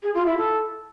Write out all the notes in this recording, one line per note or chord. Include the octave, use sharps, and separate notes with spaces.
G#4
F4
E4
A4